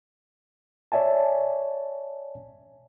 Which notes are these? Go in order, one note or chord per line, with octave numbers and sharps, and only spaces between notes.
C#5 D5 E5 G#5 A5